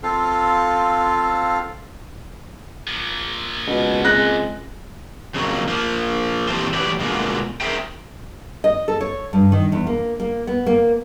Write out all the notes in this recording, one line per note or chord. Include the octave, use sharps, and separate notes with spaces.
C4 F4 A4 F5
A#2 F3
C#2 B2
G#3 C4 F#6 A#6
F2 C#3 F#3 A#3
F3 A#3
A#2 E3 C4 G4 A4 C5
A2 E3 F#3 G4 B4 D5
B2 D3 G#3 A#3 F4 F#4
G#4 A#4 C5 E5 G5
D#5
A4
C#5
G2
D#3
E2
A#3
A#3
B3
A#3